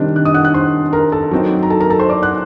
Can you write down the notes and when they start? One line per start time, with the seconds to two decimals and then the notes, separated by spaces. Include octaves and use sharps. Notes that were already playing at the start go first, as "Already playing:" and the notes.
Already playing: C3 D#3 G3 D4 C5
0.16 F#6
0.25 D#5 D#6
0.34 F#5 F#6
0.44 F#5 F#6
0.54 C5 C6
0.93 A#4 A#5
1.12 A4 A5
1.31 F#3 C4 D#4
1.63 A#5
1.70 A4 A5
1.80 A#4 A#5
1.90 A4 A5
1.99 C5 C6
2.09 D5 D6
2.22 F#5 F#6